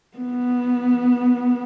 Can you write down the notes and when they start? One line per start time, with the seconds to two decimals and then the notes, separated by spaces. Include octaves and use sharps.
0.17 B3